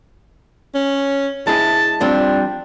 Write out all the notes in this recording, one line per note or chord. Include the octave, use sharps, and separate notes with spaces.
C#4
G#3 E4 G#4 A5
F3 G3 C4 D4